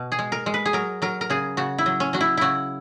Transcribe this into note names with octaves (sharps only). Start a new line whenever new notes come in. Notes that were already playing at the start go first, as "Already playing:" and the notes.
Already playing: B2
G#4
G#3
A#4
G#3
B4
G#4
F#3 A#4
F#3 A#4
A#4
C#3 G#4
C#3 F#4
E4
F#3
C#4
F#3 F#4
E4
C#3 E4 F#4